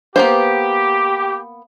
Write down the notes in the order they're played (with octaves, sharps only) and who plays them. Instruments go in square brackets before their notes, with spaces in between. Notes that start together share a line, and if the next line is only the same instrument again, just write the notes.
[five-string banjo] A#3 B3 C5 [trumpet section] G4